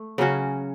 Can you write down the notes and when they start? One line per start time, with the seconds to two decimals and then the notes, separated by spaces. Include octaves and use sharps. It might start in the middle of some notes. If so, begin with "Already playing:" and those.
Already playing: A3
0.18 C#3 F#3 C#4 F#4